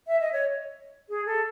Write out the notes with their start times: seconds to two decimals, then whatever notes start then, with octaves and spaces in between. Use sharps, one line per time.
0.07 E5
0.20 D#5
0.33 C#5
1.09 G#4
1.26 A4